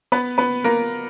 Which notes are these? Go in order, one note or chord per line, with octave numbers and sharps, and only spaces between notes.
B3 B4
B3 B4
A#3 A#4